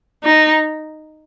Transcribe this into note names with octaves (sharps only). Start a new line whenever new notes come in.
D#4